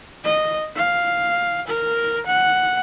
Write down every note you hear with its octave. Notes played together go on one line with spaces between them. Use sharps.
D#5
F5
A#4
F#5